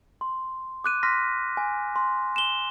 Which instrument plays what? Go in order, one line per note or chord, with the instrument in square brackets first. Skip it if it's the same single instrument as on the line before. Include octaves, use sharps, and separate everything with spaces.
[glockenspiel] C6
D6 F#6 D#7
C6 F6 A#6 B6
G#5
C6
E7 G7